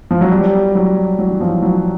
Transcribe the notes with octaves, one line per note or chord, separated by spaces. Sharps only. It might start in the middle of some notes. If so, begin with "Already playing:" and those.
F3
F#3
G3
F#3
F#3
E3
F3
F#3